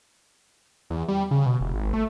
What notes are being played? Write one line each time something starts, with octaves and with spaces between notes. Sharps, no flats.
E2
G3
C#3
B2
F1
G#1
A3